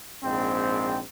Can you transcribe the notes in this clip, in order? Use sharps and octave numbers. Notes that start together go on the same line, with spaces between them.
A#1 G#2 C4